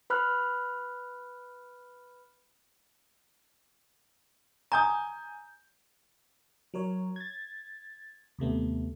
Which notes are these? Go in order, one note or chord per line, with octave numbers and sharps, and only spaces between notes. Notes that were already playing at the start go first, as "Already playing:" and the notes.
B4 B5 F6 F#6
G#5 A#5 D#6 G6
F#3 A#4 C#5
G#6 A6
D#2 C3 A3 B3